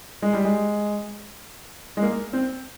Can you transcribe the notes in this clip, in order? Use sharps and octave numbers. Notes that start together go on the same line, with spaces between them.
G#3
G3
G#3
G#3
A#3
C4